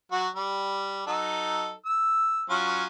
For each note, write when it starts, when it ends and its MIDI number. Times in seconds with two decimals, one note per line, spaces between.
0.12 0.28 54
0.12 0.28 66
0.36 1.03 55
1.07 1.73 54
1.07 1.73 63
1.07 1.73 69
1.85 2.44 88
2.50 2.85 54
2.50 2.85 61
2.50 2.85 65